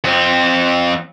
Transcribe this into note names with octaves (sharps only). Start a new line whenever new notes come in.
F2 C4